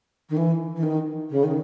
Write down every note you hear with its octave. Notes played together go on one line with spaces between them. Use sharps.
D#3
E3
E3
D#3
C#3
D#3